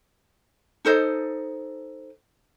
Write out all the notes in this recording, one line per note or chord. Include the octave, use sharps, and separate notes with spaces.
D#4 A4 C5 D#5